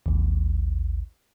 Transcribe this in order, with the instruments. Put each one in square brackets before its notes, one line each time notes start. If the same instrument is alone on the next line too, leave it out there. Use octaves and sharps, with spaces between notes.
[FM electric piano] A1 D#2